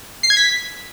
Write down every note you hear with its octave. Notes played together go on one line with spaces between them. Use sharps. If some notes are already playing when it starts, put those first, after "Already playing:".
C7
G#6
B6